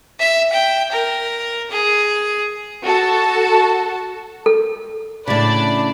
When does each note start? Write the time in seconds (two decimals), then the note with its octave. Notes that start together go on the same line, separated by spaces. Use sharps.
0.20 E5
0.52 G5
0.91 A#4
1.70 G#4
2.84 F#4 A4 A5
4.46 A4
5.27 A2 C#3 D4 D5 B5